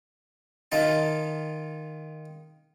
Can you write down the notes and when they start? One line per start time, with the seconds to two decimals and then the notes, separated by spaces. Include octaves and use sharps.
0.72 D#3 D#4 F4 A5